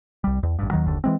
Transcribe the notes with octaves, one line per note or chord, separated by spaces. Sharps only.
C2 G3
E2
A1 G2
D#2 D#3 F#3
F#1 D#2 D3
E3 G#3 C4